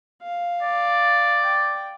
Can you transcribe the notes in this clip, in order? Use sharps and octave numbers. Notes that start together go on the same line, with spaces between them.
F5
D5
G5